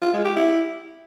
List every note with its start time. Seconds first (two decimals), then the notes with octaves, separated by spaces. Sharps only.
0.02 F4
0.13 G#3
0.25 G4
0.36 E4